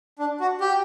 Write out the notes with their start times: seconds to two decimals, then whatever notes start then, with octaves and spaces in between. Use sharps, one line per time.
0.19 D4
0.40 F#4
0.61 G4